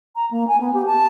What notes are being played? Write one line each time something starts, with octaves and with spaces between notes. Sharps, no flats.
A#5
A#3
G#5
B3
G4
A5